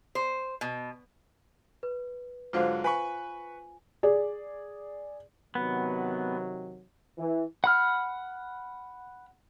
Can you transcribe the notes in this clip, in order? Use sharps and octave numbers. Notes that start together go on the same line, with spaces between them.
C5
B2
B4
G#2 D3 F#3 F4 C5 F5
B4 G#5 B5 C#6
G#4 D5
C3 D#3 F#3 B3
E3
F#5 B5 F6